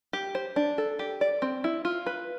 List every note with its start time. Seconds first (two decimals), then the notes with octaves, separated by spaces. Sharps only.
0.13 G4
0.35 C5
0.56 D4
0.78 A4
0.99 G4
1.21 D5
1.42 C4
1.64 E4
1.85 F4
2.06 B4